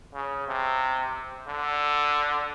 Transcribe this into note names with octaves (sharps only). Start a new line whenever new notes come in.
C#3
C3
D3